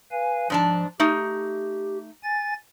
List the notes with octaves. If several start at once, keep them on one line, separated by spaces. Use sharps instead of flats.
B4 F5 G#5
G#2 F3 D4 A5
A3 D#4 G4
G#5 A6